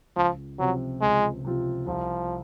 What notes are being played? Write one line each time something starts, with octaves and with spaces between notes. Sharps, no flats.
C#2 F3
C3 F3 F#3 C4 F4
C#2 G#3
C3 F3 C4 F4
C2 F3